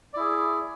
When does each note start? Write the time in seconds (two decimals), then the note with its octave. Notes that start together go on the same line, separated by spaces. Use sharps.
0.14 D5
0.17 E4
0.20 G#4